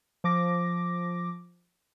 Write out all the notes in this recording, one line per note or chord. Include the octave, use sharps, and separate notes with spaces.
F3 D6 A#6